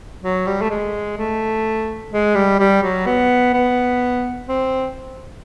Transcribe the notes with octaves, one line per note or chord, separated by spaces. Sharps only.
F#3
G3
A3
G#3
A3
G#3
G3
G3
F#3
B3
B3
C4